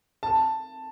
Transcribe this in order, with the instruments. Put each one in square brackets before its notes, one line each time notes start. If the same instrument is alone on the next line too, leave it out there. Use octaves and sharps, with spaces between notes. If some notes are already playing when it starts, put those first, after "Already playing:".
[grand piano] A5